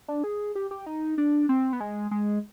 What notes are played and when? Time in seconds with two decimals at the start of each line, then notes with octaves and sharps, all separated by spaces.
0.08 D4
0.24 G#4
0.55 G4
0.71 G4
0.86 D#4
1.18 D4
1.49 C4
1.73 B3
1.80 G#3
2.11 G#3